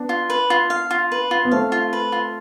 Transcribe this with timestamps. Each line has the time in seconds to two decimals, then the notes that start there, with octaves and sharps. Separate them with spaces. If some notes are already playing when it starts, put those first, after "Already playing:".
Already playing: B3 D4
0.09 F4
0.30 B4
0.50 F4
0.70 F5
0.91 F4
1.12 B4
1.31 F4
1.45 B3
1.51 A3 C4 F5
1.72 F4
1.93 B4
2.12 F4